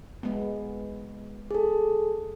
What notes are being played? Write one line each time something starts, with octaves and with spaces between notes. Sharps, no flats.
G#3 B3
G#4 A4